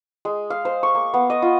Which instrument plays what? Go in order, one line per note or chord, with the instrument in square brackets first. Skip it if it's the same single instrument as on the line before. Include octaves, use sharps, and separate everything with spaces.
[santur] G#3
F5
C5
C#6
A#3
B3
D#5
F4